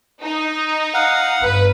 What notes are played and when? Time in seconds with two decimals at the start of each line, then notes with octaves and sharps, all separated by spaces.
0.21 D#4
0.94 F5 F#5
1.41 G1 B4